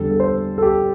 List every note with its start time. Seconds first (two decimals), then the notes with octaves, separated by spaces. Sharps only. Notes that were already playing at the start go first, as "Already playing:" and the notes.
Already playing: E2 D3 G3 A4
0.11 A4
0.20 C5
0.58 A4
0.62 G4